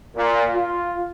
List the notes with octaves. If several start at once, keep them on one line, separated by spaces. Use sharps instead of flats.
A#2
F4